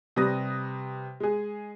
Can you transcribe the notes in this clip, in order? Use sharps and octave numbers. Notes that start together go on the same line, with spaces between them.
C3 G3 B4 D#6 A#6
G#3 G#4